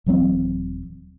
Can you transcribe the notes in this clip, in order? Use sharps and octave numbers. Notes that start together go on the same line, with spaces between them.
D#1 E3 F#3 C4